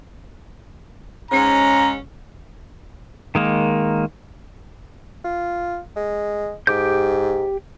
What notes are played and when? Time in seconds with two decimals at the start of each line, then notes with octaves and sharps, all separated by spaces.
1.31 G#2 C#4 A#5
3.35 D#3 G#3 A#3
5.24 F4
5.96 G#3
6.67 G#2 G4 D6 G6